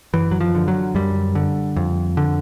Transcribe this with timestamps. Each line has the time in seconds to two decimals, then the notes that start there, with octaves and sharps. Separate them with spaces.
0.14 F#2 E3
0.31 F#3
0.41 F3
0.55 D3
0.68 F#3
0.95 F#2 G3
1.35 D3
1.76 F2
2.17 D3